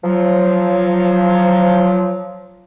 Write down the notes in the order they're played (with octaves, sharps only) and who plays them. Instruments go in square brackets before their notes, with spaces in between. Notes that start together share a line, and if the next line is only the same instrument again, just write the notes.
[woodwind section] F3 F#3